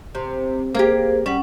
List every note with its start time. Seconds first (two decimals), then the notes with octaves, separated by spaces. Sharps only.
0.15 C3
0.75 A#3 G4 G#4 C5
1.26 G3 C#4 F#5